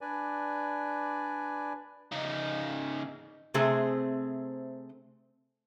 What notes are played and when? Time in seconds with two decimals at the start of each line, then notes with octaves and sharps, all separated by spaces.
0.01 D4 B4 D5 G#5
2.12 C#3 D#4
3.54 C3 A3 C4 G#4